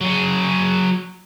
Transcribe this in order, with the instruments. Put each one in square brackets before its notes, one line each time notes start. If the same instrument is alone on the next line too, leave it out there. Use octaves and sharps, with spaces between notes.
[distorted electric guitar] F#3 G#4